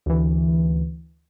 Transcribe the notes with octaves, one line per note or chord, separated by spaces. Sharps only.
D2 E3